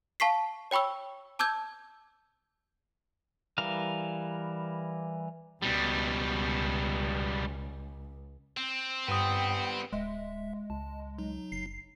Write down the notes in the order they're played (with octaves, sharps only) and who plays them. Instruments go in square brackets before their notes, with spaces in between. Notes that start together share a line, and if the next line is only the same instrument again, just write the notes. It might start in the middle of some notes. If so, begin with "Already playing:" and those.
[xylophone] F5 A5 C#6 B6 C7
C#5 G5 B5 C#6 E6
A5 D6 E6 G6 G#6
[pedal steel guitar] E3 G3 A#4 F5
[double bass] C#2 [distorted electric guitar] B2 G3
[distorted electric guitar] C4
[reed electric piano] G2 D#6 [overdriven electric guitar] G3 B3 [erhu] G5
[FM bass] D1 [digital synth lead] G#3 [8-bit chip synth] E5
[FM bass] C#2 [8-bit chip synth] A5
[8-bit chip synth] F#3 D#4
[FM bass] F#1 [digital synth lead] C7